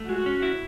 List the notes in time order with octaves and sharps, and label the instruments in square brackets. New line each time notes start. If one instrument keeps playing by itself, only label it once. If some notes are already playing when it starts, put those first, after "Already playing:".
Already playing: [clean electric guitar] A3
[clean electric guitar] G#3 [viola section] F#4
[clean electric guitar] C#4
E4